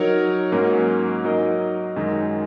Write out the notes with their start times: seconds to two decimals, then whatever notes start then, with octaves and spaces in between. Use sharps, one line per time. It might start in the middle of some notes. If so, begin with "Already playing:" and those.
Already playing: F#3 D#4 A#4 C#5
0.52 G#2 F#3 A#3 C#4 A#4
1.24 F#3 D#4 A#4 D#5
1.96 F#2 D#3 G#3 D#4